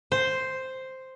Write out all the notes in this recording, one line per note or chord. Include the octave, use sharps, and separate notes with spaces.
C5